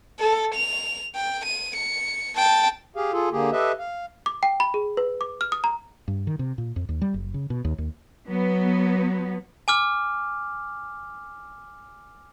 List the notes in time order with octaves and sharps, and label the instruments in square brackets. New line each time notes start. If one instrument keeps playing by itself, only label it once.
[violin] A4
F7
G5
D#7
C#7
G5 A5
[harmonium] G4 G#4 F5
F4 G#4 A4
D3 A#3 G4 G#4
G4 A4 B4 D#5 E5
F5
[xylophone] D6
G5
B5
G#4
B4
D6
F6
D#6
A#5
[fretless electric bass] G2
D#3
C3
A#2
F2
D#2
G3
F#1
C#3
B2
D#2
D#2
[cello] F#3 [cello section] B3
[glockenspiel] G#5 D6 F6